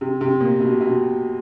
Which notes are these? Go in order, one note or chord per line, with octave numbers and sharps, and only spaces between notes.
C3
C3
A#2
B2
B2